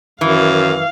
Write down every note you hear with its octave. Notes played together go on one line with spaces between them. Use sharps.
F#2 D#3 E3 F5